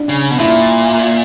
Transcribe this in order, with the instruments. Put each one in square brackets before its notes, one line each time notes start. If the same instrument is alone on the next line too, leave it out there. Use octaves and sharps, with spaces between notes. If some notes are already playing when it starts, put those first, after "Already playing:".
Already playing: [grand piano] D4 D5
[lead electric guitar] C#3
B2
[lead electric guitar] A#2 [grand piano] E4 E5